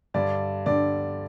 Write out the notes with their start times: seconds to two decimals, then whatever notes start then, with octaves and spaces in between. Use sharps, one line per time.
0.14 G2 D3 D5
0.66 G2 D3 D5